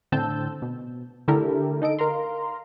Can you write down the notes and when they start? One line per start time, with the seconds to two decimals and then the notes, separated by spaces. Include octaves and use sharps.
0.12 A2 D3 C4 A5 E6 G6
0.62 B2
1.28 D3 A3 E4 G4 A4 A#4
1.82 D#4 A4 D#5 D7
1.99 A#4 F5 A#5 C6